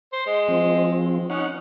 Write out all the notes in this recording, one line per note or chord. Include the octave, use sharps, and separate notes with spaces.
C5
G#3
F3 C4
C#4 D#4 F#5